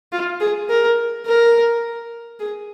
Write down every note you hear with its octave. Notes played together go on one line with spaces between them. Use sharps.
F4
G#4
A#4
A#4
G#4